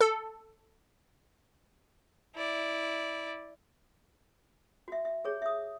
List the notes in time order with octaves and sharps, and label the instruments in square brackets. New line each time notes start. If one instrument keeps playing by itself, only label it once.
[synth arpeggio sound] A4
[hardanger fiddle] E4 D5
[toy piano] F#4 E5
E5
G4 G#4 C#5
E5 D#6